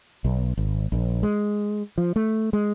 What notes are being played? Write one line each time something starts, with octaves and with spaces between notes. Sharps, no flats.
B1
G#1
A#1
G#3
F3
A3
G#3